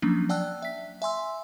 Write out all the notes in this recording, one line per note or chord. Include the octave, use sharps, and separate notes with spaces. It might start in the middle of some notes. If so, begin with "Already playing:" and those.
F3 F#3 A#3 C#4 D4
D5 F#5 G5 A5 E6 F#6
E5 B6
E5 G#5 C6 E6